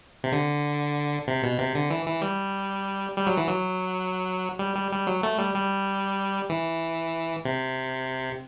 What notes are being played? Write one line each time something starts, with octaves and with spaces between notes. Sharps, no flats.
C3
D3
C3
B2
C3
D3
E3
E3
G3
G3
F#3
E3
F#3
G3
G3
G3
F#3
A3
G3
G3
E3
C3